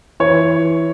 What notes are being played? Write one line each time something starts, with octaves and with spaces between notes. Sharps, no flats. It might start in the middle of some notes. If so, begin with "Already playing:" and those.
E3 C#5